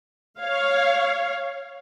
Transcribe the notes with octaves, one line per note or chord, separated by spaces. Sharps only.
C#5 F5